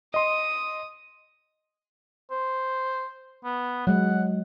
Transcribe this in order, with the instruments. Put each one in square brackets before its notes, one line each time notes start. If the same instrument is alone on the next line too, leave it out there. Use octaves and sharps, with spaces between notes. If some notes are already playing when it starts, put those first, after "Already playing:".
[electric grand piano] D#5 C6 [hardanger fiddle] D#6
[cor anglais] C5
B3
[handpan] F#3 G#3 [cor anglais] F#5